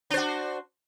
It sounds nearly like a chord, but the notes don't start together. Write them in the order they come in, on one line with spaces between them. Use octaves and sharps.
D4 C5 F#4